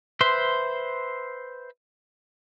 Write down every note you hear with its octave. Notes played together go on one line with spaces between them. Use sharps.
B4 C5 E5 C6